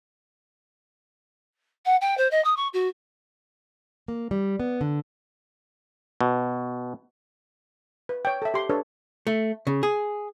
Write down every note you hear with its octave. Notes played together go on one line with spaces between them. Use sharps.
F#5
G5
C5
D#5
D#6
C#6
F#4
A#3
G3
B3
D3
B2
B4
C#5 G5
A4 E5
G4 C6
D4 A4 B4 C#5
A3
C#3
G#4